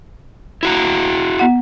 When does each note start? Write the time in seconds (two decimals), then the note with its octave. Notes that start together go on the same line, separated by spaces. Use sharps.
0.63 E4 F#4 A#5
1.39 B3 F#5